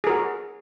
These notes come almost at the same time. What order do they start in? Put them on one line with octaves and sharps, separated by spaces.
G#4 A#4 F#4